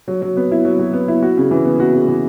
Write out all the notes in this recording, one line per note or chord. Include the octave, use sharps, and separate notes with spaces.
F#3
F#3
B3
E4
F#3
F#3
B3
E4
F#4
C#3
E3
B3
F#4
C#3
E3